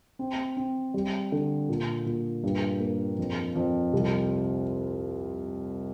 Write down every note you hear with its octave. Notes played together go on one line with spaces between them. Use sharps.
C4
C4
G3
D3
A#2
A#2
G2
A#3
F2
F2
C2